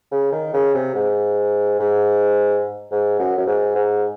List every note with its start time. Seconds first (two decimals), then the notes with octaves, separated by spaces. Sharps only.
0.12 C#3
0.32 D#3
0.53 C#3
0.74 C3
0.95 G#2
1.80 G#2
2.91 G#2
3.19 F#2
3.38 F#2
3.47 G#2
3.75 G#2